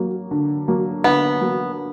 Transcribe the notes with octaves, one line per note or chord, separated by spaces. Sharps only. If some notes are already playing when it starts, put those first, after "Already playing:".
Already playing: F#3 A#3
D3
F#3 A#3
D3 B3
F#3 A#3